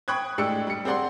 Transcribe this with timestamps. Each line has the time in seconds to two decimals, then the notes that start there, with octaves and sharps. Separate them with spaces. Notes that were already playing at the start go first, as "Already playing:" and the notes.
0.08 G5 B5 C#6 D#6 F#6 G#6
0.38 A2 G#3 D4 G4 E6 C#7
0.67 G3 C#7
0.85 C4 G4 G#4 D5 F#5 C6